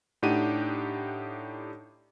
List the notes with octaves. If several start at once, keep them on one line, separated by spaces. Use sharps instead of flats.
A2 D4 D#4 G4 F#5 D#7